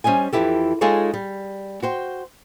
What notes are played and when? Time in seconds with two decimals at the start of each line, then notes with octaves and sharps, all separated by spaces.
0.04 G3 C#4 C5 D#5 G#5
0.33 F2 C#3 E3 E4 G4 A4
0.81 G#3 D#4 F4 G#4 A4 C#5
1.14 G3
1.82 F#4 C5 G5